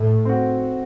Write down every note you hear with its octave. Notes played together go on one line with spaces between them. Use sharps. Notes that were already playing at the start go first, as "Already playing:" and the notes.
Already playing: A2 A3
C4 F#4